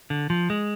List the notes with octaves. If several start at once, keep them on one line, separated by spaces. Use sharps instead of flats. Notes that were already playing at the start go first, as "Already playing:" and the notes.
D3
F3
G#3